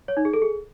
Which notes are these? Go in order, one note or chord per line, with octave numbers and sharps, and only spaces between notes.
C#5
D#4
G#4
A4
G#4